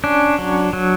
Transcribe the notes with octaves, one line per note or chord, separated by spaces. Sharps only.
C#4 D4
F#3
F#3